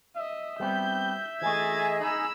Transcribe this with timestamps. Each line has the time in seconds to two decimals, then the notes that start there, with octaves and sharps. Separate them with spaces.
0.16 D#5 E5
0.60 G3 B3 C4 G6
1.42 E3 A3 G#4 D#5 G#6 A6
2.00 D#4 B5 E6